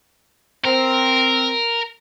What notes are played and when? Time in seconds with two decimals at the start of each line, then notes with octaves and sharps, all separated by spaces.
0.65 C4 A#4